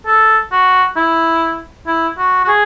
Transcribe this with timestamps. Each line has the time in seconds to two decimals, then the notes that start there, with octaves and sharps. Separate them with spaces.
0.07 A4
0.52 F#4
0.97 E4
1.87 E4
2.18 F#4
2.45 F#4
2.48 G#4